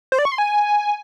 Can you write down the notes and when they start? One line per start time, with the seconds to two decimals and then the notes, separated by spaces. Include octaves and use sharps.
0.12 C5
0.19 D5
0.25 C#6
0.32 C6
0.38 G#5